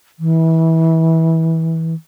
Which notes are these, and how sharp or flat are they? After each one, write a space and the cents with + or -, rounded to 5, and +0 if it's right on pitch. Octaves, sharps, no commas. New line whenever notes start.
E3 -25